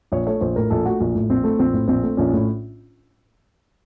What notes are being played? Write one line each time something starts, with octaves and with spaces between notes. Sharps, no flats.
A#1 C#5
A3 C#5
A#1 C5
A2 A#4
A#1 A4
A3 F#4
A#1
A2
A#1 C4
A3
A#1 C4
A2
A#1 C4
A3
A#1 C#4
A2